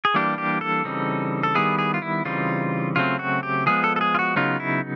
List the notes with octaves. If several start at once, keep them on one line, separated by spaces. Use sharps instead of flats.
G#4
E3 G3 A#3 D4 G4
G4
A4
C#3 E3 G3 C4 D#4
A4
D#3 G3 B3 E4 G#4
G#4
F4
E4
C#3 E3 G3 C4 D#4 F4
C#3 F#3 A3 C4 F4
F#4
G4
F3 G#3 B3 G#4
A4
A4
G#4
F4
F#4
C#3 F#3 B3 D#4 F4
E4